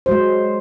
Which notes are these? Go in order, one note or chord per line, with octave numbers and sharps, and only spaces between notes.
F#3 G#3 C5